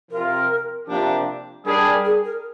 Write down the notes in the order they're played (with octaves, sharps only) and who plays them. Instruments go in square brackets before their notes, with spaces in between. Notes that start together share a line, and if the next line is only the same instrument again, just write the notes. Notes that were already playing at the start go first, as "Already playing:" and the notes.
[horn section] C3 F3 C4 F4 [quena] A#4
[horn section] C3 F3 A#3 D4 G4
[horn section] G3 D4 G#4 [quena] A#4
[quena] A#4
G#4
A#4